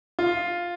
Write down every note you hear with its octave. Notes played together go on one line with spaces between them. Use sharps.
F4